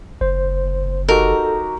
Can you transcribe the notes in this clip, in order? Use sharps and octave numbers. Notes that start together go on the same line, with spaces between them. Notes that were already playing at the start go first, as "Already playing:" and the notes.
F#1 C5
D#4 F#4 G4 A4 A#4